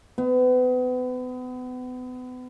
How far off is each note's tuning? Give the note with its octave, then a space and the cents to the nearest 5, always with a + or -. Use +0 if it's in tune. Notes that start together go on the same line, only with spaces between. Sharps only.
B3 +35